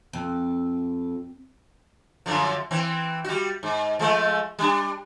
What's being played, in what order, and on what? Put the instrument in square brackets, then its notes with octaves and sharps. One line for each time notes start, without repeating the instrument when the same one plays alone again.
[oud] F2
[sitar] F#2 D3 F3
E3 C4
G3 F#4
G#2
F3 G#3 A3
G3 D4